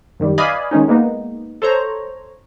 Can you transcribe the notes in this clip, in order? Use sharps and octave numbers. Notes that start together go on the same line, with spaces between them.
F#2 D#3 G3
B4 D5 D#5 F5 G#5 B5
D#3 G#3 C#4 D#4
G#3 A#3 B3 D#4
A4 C5 C#5 A#5